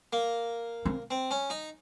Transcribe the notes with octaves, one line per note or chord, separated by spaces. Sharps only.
A#3
C4
C4
C#4
D#4